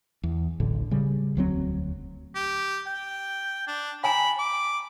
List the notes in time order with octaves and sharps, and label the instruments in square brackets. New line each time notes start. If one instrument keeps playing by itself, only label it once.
[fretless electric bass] E2
D1 A1 A2 D3
C#3 G3
E1 D2 F#3 C4
[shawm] G4
G5
D4
[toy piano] G5 G#5 A#5 [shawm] B5
[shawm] D6